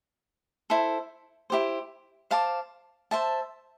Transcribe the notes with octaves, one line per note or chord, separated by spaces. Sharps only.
E4 A4 C5
E4 G4 C5
C5 F5 A5 D6
C5 E5 A5